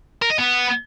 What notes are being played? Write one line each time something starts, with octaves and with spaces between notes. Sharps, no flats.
A#4
D#5
B3